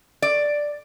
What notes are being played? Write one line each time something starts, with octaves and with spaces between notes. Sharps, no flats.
D5